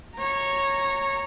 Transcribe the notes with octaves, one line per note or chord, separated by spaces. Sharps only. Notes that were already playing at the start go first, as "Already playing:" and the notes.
C#5 A#5